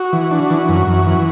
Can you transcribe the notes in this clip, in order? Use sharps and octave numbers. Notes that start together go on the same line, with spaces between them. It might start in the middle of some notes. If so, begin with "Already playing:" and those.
Already playing: F#4
E3
D4
E3
F#2
F#2
E3